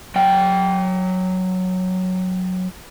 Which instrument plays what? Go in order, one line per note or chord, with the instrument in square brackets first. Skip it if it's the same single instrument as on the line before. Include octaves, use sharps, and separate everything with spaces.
[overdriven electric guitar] F#3 G5